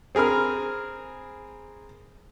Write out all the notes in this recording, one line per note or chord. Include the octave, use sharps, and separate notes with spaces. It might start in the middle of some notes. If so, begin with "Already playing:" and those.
C4 G#4 A#4 B5 F6